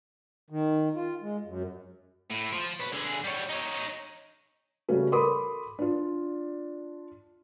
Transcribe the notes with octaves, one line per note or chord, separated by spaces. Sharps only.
D#3
F4
G#3
F#2
A2
F3
B4 C#5
D3 G#4
G3 C#5
D#4 C#5
C#3 G3 A3 C#4 F#4 A4
A4 A#4 B5 C6 D6 D#6
D4 F4